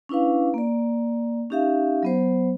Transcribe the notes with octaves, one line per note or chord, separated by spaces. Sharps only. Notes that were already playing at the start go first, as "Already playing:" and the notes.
C#4 D4 E4 B4 F5
A#3 D5
C#4 D#4 G4 E5 F5
F#3 B3 C5